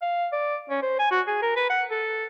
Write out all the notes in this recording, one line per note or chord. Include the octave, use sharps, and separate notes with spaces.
F5
D5
C#4
C5
G#5
F#4
G#4
A#4
B4
F#5
A4